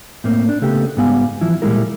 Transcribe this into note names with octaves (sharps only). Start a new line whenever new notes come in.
A2 A#3 C4
D4
C#3 A3 B3 G4
G#2 G3 B3 F5 G#5
E3 F3 E4
A#2 G3 G#3 A#3 E4 A#4